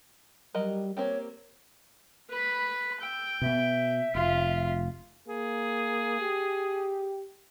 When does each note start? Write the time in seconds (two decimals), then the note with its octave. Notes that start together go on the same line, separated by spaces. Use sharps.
0.55 F#3 G3 A#4 D#5
0.97 A#3 C4 G4 C#5
2.30 B4 B5
3.00 G5 E6
3.42 B2 B3 E5
4.15 F1 F4
5.28 A#3 G#4
6.20 G4